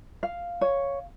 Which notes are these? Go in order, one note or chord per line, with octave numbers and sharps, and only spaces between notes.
F5
C#5